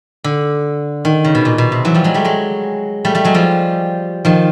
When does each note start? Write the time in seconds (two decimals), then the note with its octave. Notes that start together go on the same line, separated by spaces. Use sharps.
0.24 D3
1.05 D#3
1.25 C#3
1.35 B2
1.45 A#2
1.58 B2
1.72 C3
1.85 E3 F#3
1.94 F3 G3
2.04 F#3 G#3
2.14 G3 A3
2.25 F#3 G#3
3.05 G3 A3
3.15 G3 A3
3.24 F#3 G#3
3.34 F3 G3
4.25 D#3 F3